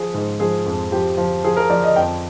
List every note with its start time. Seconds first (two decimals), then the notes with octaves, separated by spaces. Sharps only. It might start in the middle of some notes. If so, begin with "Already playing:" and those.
Already playing: F3 G#4
0.14 G#2
0.40 F3 G#4
0.66 F2
0.92 F3 G4
1.17 F3
1.44 F3 G#4
1.57 A#4
1.70 F3 D5
1.83 D#5
1.96 F2 G5